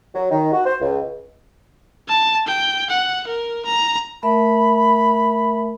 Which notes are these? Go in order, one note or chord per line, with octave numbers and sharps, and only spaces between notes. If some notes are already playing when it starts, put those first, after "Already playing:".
F#3
D#3
F#4
C5
C#2
A5
G5
F#5
A#4
A#5
A3 A#4 E5 B5